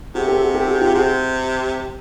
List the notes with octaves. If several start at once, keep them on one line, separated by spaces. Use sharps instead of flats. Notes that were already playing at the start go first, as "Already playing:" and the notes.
C3 F#4 G#4
G4 A4
F#4 G#4
G4 A4
F#4 G#4
F4 G4
C3 F#4 G#4